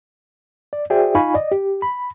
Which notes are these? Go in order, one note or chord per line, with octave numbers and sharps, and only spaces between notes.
D5
F#4 G#4 C5 D5 E5 G5
D#4 F4 F5 G#5 B5 C#6
D5 D#5
G4
B5